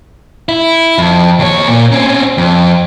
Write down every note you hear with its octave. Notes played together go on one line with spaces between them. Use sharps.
E4
F2
D#2 C#5
A#2
C4 C#4
F2